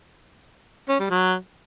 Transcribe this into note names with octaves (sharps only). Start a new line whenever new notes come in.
C#4
G3
F#3